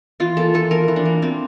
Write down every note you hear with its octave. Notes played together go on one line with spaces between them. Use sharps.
E3 F4
A#3 A4
E3 A4
A#3 A#4
E3
D4
A#3
A#3 C4